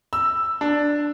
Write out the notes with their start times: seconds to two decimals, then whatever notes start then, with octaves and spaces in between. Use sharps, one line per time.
0.13 E6
0.61 D4